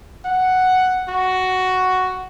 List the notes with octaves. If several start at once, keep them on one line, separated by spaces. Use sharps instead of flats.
F#5
F#4